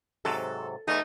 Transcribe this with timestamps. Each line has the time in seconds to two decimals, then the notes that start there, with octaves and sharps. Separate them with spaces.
0.25 G#2 C3 F#3 A4
0.88 E2 E3 A3 D#4